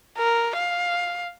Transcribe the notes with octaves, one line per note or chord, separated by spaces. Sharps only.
A#4
F5